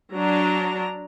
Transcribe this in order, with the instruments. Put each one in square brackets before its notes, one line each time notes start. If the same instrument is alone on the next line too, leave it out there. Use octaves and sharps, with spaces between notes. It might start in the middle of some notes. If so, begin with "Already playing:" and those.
[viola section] F#3 D4 A#5